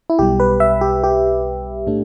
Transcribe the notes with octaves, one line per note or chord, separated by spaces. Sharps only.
E4
B1 B2 G3 G4
B4
E5
G4
G4
A2 A3 D4